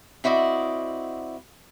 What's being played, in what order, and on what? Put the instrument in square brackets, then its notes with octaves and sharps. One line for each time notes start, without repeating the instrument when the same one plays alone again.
[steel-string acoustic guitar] C4 E4 F#4 D5 D#5